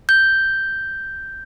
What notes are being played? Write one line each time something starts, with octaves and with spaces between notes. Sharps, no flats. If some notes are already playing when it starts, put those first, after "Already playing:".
G6